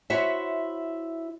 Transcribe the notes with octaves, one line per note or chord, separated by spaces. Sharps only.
E4 F#4 C5 C#5 E5